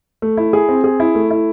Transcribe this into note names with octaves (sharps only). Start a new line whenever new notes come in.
A3
E4
G#4
C4
G#4
E4
A3
E4